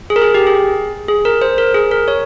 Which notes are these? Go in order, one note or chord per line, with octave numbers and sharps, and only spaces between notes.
G#4
A#4
G#4
G4
G#4
G#4
A#4
C5
A#4
G#4
A#4
C#5